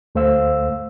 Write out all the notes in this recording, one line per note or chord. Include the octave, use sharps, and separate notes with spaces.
D2 A3 C5 F5 E6